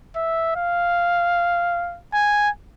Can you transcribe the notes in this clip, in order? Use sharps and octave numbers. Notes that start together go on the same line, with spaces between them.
E5
F5
G#5